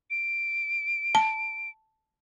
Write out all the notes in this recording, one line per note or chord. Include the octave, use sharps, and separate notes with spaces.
D7
A5